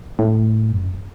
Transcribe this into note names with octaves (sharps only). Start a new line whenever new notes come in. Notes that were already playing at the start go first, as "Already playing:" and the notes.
A2
F#2